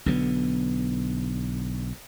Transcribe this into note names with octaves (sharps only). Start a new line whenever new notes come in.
B1 D3 B3